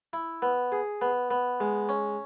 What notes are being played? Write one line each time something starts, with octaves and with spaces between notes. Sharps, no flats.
E4
B3
G#4
B3
B3
G#3
C#4